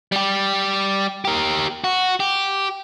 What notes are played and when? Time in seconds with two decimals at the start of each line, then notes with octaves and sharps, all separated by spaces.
0.12 G3 G4
1.25 G4 A#4
1.84 F#4
2.20 G4